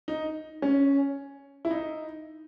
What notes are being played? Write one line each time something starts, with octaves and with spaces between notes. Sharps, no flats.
D#4
C#4
E4
D#4